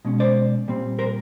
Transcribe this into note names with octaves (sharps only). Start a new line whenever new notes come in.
B2 G#3 C#4
C5 D5
A#2 G3 C4
A#4 C5